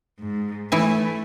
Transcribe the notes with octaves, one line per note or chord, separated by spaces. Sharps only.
G#2
E3 A3 E4 G#5